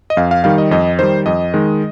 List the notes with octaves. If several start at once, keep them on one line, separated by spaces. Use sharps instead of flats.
D#5
F2 F5
F5
D#3 G3 F5
D#5
F2 D#5
D#3 G3 C5
F2 D#5
D#3 G#3